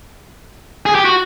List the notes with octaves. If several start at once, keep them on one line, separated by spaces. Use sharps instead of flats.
G#4
G4
F#4